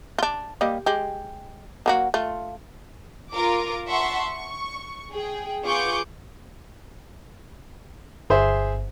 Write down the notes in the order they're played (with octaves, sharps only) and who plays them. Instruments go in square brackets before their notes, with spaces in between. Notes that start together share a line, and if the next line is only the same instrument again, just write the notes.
[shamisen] D4 F4
G3 A#3 D#5
G#3 G4
F#3 A#3 F#4
A3 F4
[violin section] F4 A#4 D6
E5 F#5 A5 C6 C#6
C#6
G#4 G5
B3 F4 G#4 C#6 D6 G6
[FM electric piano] G1 [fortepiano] G#4 C5 E5